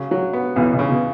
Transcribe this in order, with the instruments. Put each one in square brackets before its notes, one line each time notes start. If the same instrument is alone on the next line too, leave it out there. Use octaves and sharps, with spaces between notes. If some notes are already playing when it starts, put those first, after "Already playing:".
Already playing: [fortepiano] C#3 F#3
F#3
B3
[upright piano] B1 B2 [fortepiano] E2
[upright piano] B1 B2
[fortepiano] C#3
[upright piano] B2